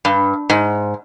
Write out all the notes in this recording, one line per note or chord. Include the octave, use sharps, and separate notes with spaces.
G2
G#2